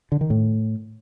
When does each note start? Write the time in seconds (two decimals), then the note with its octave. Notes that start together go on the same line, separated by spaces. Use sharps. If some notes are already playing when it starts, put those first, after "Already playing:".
0.12 D3
0.21 D#3
0.30 A2